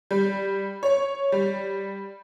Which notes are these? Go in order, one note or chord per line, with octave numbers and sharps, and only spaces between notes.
G3
C#5
G3